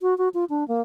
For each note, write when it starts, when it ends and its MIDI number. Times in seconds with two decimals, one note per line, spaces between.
0.01 0.17 66
0.18 0.29 66
0.34 0.45 65
0.50 0.66 62
0.68 0.81 58